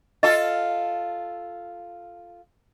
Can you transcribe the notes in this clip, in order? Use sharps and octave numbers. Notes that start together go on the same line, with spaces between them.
F4 A4 D#5